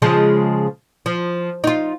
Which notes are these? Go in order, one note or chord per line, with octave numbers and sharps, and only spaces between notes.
C#3 F3 G#3
F3
D#4 F4